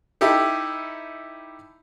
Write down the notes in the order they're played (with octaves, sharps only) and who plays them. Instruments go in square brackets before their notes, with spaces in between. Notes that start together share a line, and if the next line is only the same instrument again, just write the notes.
[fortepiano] D#4 E4 G4 A4